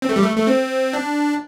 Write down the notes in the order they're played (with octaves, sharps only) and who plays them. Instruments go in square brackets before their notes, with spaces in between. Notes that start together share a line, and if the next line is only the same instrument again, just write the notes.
[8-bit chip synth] C4
A3
G3
A3
A3
C4
D4